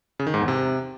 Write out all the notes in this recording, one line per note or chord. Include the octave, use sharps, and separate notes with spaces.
C#3
D#3
G#2
E2
C3